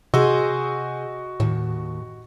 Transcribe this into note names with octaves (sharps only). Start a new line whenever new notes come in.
C3 F#4 G#4 C5 D#5 E6
D#2 A2